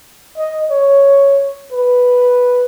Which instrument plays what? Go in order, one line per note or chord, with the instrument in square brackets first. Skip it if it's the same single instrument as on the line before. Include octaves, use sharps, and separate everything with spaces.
[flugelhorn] D#5
C#5
B4